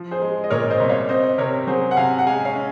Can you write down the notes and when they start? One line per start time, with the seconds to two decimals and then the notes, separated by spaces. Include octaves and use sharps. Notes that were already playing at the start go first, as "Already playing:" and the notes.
Already playing: F3
0.11 G#4 C5
0.22 G#3
0.44 D#5
0.50 A#2 A#4 C#5
0.70 C5 D#5
0.80 C2
0.89 C#5 F5
1.09 C4 C5 D#5
1.38 C3 A#4 C#5
1.67 F#3 G#4 C5
1.91 F#5
1.97 C3 F5 G#5
2.19 F#5
2.26 G#3 F5 G#5
2.45 C#5 F5
2.55 C#4